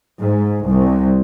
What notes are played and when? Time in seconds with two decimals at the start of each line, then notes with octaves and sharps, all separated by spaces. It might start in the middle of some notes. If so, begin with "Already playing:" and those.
0.19 G#2
0.65 C2